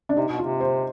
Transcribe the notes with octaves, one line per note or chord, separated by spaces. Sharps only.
D4
C3 D#4
B2
C3 F4
C5